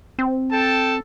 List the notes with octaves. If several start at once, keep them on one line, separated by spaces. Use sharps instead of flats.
C4
A4 G5 A5